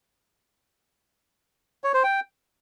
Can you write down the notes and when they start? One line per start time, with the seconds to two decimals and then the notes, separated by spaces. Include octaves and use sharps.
1.84 C#5
1.94 C5
2.04 G5